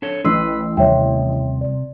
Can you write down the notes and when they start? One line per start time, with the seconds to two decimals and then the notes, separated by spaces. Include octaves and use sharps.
0.02 D4 A4 C#5
0.24 A1 B4 C6 E6 C7
0.77 D#2 C3 G3 C#5 E5 G5
1.61 D5